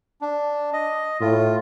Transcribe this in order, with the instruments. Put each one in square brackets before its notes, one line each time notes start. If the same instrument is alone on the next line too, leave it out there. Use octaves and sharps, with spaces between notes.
[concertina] D4
D#5
[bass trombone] A2 [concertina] F4